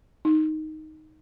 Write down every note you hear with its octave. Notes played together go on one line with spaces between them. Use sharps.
D#4